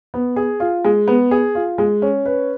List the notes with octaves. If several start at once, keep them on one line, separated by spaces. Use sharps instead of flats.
B3
G#4
F4
G#3
B3
G#4
F4
G#3
C#4
B4